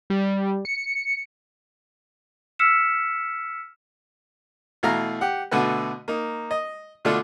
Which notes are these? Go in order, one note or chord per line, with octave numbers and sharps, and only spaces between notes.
G3
C#7
E6 F6 B6 C#7 E7
B2 E3 A3 F5 A#5 F6
G4 F#5
B2 D3 A3 F#4 B4
A#3 D#4
D#5
B2 D3 A3 D4 F4 A4